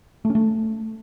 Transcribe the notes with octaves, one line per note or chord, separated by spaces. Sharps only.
A3
C#4
A3